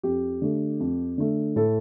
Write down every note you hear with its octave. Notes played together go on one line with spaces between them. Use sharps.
F2 G4
D3 A3
F2
D3 A3
A2 A4